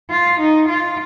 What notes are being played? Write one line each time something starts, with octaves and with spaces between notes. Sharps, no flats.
F4
D#4
F4